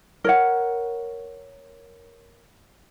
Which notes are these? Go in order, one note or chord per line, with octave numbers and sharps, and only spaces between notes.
A#4 C#5 F#5